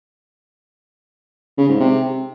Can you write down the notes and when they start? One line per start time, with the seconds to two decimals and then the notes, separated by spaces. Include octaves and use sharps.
1.58 C#3
1.69 G#2
1.80 C3